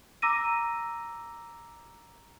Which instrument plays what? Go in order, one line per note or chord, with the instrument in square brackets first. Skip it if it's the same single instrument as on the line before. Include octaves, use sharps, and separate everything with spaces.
[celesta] A#5 D6 E6 A#6 D#7